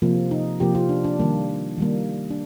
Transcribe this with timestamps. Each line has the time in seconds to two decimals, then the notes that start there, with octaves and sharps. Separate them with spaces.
0.02 C3 F3 A#3
0.31 D#4
0.60 C3 F3 A#3 G4
0.75 F4
0.89 D4
1.04 D4
1.19 D#3 G3 A#3
1.78 D#3 G3 A#3
2.30 D4